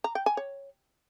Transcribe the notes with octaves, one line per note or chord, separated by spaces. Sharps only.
A#5
G5
G#5
C#5